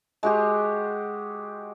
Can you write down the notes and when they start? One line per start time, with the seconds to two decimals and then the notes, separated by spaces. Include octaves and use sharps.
0.23 G#3 F#4 G4